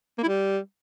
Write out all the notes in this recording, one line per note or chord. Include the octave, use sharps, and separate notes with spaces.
A#3
E4
G3